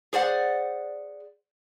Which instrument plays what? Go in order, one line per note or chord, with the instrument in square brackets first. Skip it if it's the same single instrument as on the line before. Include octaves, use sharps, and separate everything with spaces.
[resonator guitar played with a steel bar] G#4 C5 D5 F#5